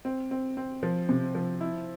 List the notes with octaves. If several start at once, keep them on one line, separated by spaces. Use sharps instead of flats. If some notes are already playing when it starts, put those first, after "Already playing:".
C4
C4
C4
F3
C3
F3
E4